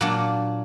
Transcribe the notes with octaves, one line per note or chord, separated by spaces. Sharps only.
A#2 F#3 A#3 D4